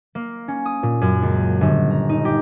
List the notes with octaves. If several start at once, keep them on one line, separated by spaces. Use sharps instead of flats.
A#3
C#4
D#6
A#2
F#2
C#2
G1
A#5
D#4
G4